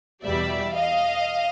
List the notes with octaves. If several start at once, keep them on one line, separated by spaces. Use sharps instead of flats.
E2 B2 G3 D5 E5
D#5 F5